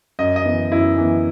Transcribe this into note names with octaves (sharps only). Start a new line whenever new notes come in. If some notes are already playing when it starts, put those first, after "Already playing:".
F#2 D#5
D#5
E3 B3
F#2 E4
E3 B3